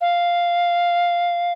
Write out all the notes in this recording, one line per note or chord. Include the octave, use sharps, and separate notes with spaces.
F5